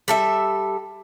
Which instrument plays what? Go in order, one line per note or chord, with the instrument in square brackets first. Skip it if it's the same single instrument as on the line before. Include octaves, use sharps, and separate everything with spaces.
[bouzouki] G3 A4 E5